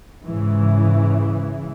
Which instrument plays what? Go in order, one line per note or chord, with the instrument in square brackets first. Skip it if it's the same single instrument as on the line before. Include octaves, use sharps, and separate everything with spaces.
[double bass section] G#2 C#3 E3